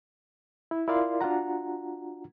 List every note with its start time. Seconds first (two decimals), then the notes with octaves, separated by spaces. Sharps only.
0.71 E4
0.88 E4 F4 A#4 D5 F5 C6
1.21 D4 F4 F#4 F#5 A#5